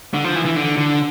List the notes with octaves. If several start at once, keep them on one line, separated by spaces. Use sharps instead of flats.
D3
F3
E3
E3
D3
D3